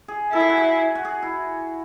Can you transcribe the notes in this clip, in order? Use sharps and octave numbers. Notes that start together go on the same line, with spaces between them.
G#4
E4 A4
G#4
F#4
G#4
F#4
G#4
E4